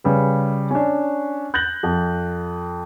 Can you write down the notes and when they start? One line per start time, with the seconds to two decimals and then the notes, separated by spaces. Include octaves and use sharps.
0.04 C#3 G3 B4
0.71 C#4 D4
1.54 F#6 G6 A6 A#6 F#7
1.83 F2